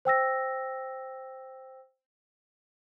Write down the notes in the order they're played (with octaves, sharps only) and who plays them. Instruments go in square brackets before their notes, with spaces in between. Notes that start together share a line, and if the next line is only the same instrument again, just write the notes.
[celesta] C5 G5 E6 A#6